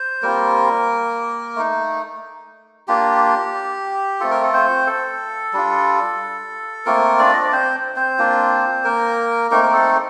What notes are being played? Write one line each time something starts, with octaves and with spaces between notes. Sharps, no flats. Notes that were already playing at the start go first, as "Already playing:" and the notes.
Already playing: C5
G3 A#3 C4 F4 A#4
A3 D#4
A#3 D4 F4 G4
A3 C4 F4 A4
A#4
A4
C4 C5
A4
G3 D4 F4
A3 A#3 C4 F4 A#4
D4 D5
D#5
D5
C4 C5
C4 C5
A#3 D4 F4
A#3 A#4
A3 A#3 C4 D#4 A#4
A#4
A4